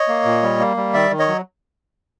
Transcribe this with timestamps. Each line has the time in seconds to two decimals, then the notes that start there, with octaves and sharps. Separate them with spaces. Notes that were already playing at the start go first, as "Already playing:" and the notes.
Already playing: C#5 D#5
0.08 A#3
0.25 A#2
0.43 G3
0.59 A#3
0.77 G3
0.93 D#3 D5 E5
1.11 D#3
1.19 C#5 D#5
1.28 F#3